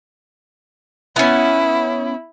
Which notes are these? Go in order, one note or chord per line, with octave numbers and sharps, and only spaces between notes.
B3 C#4 E4